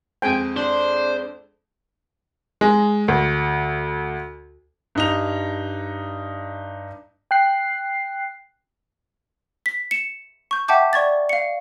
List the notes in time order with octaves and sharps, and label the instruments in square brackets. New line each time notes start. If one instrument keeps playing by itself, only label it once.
[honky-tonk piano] F2 G#3 C4 [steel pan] G5 G#5
[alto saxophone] D4 [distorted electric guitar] C5
[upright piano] G#3
D2
[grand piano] G2 D#4 F7
[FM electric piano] G5 F#6 C7
[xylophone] B6
C#7 E7
C#6 G6
E5 F#5 G5 A5 D6 G6
D5 C#6 G#6 A6
F5 C#7